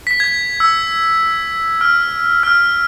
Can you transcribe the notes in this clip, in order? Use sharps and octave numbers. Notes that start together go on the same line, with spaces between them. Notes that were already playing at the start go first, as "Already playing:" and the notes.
B6
G#6
E6
F6
F6